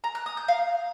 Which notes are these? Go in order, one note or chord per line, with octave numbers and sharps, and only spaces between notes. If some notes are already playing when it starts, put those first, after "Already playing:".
A#5
F#6
D#6
G6
F5